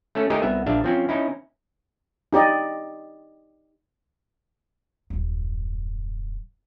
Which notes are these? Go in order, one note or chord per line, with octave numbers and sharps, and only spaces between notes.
A3 C#4 A4
G#3 A3 D#4 G4 G#4 A#4
C2 B3 E5
A#1 D4 E5 F5
F3 C4 C#4
C#4 D#4 E4
D#4 G4 D5 D#5
D#1 F#2